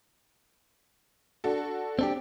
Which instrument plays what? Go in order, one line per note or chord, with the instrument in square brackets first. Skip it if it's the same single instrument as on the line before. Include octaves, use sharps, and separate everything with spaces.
[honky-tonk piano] D4 F#4 A4
[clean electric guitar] C4 D4 G4